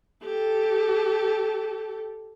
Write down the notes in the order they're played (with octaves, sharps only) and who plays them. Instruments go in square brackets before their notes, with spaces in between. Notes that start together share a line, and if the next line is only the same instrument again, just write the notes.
[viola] G4 A4